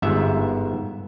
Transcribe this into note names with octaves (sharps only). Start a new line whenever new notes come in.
G1 G#2 B3 E5